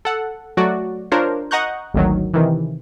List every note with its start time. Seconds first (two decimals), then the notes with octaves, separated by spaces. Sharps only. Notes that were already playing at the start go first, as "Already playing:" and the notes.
0.05 A4 F#5
0.57 F#3 A3 F#4 D5
1.12 D4 F4 A#4 C5 C#5
1.51 D#5 F#5 A#5 C#6 F#6 G6
1.94 G#1 D2 D#3 F#3
2.34 C3 D#3 E3